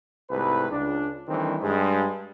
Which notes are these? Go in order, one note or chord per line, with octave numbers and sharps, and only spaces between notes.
C2 G#2 A3 B4
C#2 D4
D#3 E3 G3 A3 C4 D4
G2 G#3